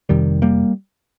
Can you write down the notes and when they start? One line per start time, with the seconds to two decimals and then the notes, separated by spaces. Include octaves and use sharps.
0.09 F1 F2 C3 D#3 G3
0.42 G3 A#3